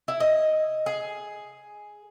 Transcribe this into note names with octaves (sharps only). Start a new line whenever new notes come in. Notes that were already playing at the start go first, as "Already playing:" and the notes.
E4
D#5
G#4